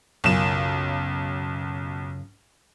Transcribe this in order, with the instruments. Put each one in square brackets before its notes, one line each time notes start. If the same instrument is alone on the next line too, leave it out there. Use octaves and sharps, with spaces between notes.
[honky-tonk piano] B1 E7 [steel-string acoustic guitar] F#2 C#3 F4